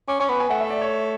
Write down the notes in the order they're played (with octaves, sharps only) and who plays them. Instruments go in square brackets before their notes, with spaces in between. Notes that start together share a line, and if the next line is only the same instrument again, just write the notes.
[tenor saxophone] C#4 [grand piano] D6
[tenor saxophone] C#4 [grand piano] C#6
[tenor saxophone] B3 [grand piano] B5
[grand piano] G#5
[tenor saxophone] A3 [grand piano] F#5
[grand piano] E5
D5
C#5